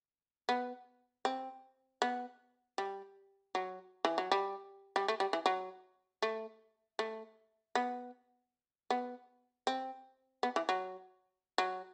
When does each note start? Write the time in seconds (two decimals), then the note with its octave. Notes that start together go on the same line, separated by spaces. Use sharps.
0.49 B3
1.25 C4
2.02 B3
2.78 G3
3.55 F#3
4.05 E3
4.18 F#3
4.32 G3
4.96 G3
5.08 A3
5.20 G3
5.33 E3
5.46 F#3
6.22 A3
6.99 A3
7.75 B3
8.90 B3
9.67 C4
10.43 B3
10.56 E3
10.69 F#3
11.58 F#3